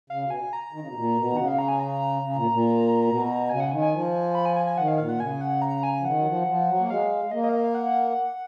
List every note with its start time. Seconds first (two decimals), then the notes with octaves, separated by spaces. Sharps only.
0.10 C#3 F5
0.24 B2
0.30 G#5
0.53 A#5
0.72 D#3
0.80 C#3
0.87 B2
0.95 A#2
1.16 B2
1.31 D#3
1.37 C#3 F#5
1.48 F5
1.58 A#5
1.68 G#5
1.80 A#5
2.22 C#3
2.36 A#2
2.51 A#2
3.07 B2
3.49 C#3 G#5
3.60 F#5
3.71 D#3 G#5
3.82 G#5
3.92 F3
4.35 B5
4.46 G#5
4.56 G#5
4.67 G#5
4.77 D#3 F#5
4.88 F5
4.98 A#2 F5
5.09 F#5
5.19 C#3 G#5
5.41 F#5
5.62 A#5
5.83 G#5
6.00 F3
6.05 D#3 F#5
6.18 F#3
6.26 F3
6.42 F#3
6.47 F3
6.69 F#3
6.79 A#3
6.89 G#3 F5
7.25 G#3
7.31 A#3 D#5
7.43 D#5
7.49 F5
7.53 D#5
7.64 F5
7.74 F#5